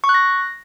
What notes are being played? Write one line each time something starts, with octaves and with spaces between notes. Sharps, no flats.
C#6
F#6
A#6